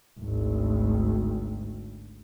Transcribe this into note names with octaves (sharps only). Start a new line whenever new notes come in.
G#1 D2